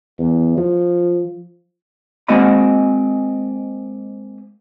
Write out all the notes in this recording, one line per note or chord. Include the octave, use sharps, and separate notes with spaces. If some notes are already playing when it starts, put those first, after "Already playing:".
E2
F3
G#3 A#3 C4 F#4 D#5 B5